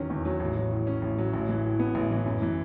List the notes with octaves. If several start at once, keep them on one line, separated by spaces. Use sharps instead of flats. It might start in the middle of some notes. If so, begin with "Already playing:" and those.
Already playing: E2 D#3 F#3 C#4
E2
F#3
A1
F#3
A2
C#4
A1
F#3
A1
E3
A2
B3
A1
E3
F#2
E3